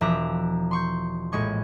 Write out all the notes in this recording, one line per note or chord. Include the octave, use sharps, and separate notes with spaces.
E1 F3 E5 A#5 D6 F#6
C6 C#6 G6
A#1 A2 G#3 C#6 G#6